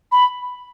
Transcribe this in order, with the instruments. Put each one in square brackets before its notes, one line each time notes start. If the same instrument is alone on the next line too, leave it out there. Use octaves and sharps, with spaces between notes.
[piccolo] B5